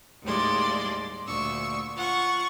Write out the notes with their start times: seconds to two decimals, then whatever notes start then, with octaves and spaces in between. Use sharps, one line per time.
0.24 D#2 A2 G3 G#3 D5 C6
1.26 D2 A#2 C#6 E6
1.95 F4 F#5 C#6